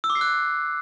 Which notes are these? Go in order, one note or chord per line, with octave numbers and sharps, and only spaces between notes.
E6
D6
C7
F#6